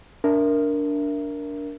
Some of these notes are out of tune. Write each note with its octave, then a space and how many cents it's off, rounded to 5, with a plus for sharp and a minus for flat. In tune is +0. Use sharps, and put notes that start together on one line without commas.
D4 -15 A#4 +0 E5 +15